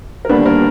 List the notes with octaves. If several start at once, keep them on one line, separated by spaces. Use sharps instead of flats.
A#4
D#2 D3 G3 B3 D4 B4
A#3 A#4